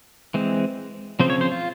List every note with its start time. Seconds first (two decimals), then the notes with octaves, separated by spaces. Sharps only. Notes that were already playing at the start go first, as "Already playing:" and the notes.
0.34 E3 G#3 C4
1.20 C#3 F3 C4 C5
1.30 C#5
1.41 C5
1.52 F4